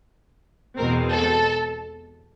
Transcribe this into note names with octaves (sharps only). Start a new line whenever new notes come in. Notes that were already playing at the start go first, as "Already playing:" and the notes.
E2 B2 G#3 C4 A#4
A4